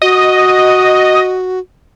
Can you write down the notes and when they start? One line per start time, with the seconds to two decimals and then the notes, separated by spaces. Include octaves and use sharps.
0.02 F#4 D#5